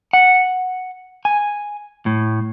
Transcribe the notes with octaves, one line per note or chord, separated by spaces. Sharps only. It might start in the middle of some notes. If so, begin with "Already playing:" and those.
F#5
G#5
A2